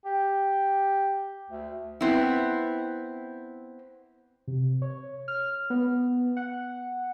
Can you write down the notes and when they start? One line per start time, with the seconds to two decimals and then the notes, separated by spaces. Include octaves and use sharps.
0.05 G4
1.50 D2
2.01 B3 C4 E4
4.48 C3
4.82 C#5
5.28 F6
5.70 B3
6.37 F#5